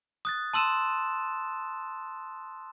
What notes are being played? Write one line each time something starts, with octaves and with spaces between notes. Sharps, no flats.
D#6 F#6 A6
A5 C6 E6 D#7 E7